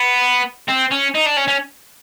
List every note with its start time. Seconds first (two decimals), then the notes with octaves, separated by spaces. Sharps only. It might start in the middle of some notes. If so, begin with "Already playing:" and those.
Already playing: B3
0.68 C4
0.91 C#4
1.15 D#4
1.26 D4
1.37 C#4
1.48 C#4